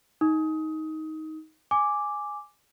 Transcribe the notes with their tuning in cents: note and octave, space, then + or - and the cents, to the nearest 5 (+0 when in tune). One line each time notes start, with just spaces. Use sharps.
D#4 +15 D#6 +25
G#5 +0 D6 +0